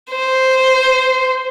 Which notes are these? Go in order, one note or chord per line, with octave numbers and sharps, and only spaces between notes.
C5